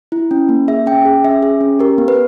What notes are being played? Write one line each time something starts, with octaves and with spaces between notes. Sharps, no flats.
E4
C#4
A#3
G#4 E5
C#4 G5
G#4
C#4 E5
G#4
C#4
G4 A#4
B3
B4